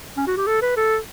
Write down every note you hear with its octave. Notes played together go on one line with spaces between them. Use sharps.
C#4
F#4
G4
A4
B4
A4